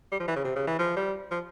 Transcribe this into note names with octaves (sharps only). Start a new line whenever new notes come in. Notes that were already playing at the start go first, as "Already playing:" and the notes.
G3
F3
E3
C#3
C3
C#3
E3
F3
G3
F3